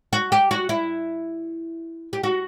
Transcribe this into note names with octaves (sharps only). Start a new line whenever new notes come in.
F#4
G4
F#4
E4
G4
F#4